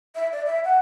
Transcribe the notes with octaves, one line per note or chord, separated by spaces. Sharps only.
E5
D5
E5
F#5